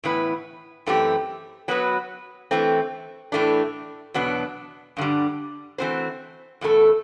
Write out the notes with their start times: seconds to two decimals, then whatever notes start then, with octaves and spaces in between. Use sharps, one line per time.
0.04 A2 E3 B3 E4 B4
0.86 F#2 E3 A3 C4 G4
1.68 F#3 B3 F#4 B4
2.51 E3 A3 C4
3.32 A2 E3 A3 D4
4.14 E2 B2 F#3 B3 D4
4.97 G2 D3 G3
5.78 E3 A3 C4 F#4 C5
6.61 E2 B2 A3 E4 A4